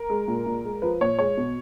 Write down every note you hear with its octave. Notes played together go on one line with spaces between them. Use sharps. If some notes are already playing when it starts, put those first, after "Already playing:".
Already playing: A#4
G#3
A#2
A#2
G#3
F3 B4
A#2 C#5
G#3 C#5
B2